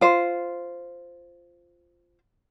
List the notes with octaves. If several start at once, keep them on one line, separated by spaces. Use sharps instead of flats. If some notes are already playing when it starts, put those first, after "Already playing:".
F4 C5